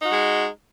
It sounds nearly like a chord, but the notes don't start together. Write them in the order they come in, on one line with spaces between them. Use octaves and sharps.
D#4 F#4 G#3